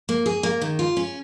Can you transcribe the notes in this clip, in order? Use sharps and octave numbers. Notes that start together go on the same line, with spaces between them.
A#3
G#4
A#3
D#3
F4
C#4